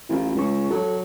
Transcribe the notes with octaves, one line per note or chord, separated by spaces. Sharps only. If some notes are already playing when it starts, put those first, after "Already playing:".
A1 E4 F4
C#2 G#3 C#6
F#3 A4